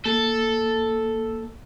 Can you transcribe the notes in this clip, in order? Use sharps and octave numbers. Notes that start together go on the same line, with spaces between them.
A#3 A4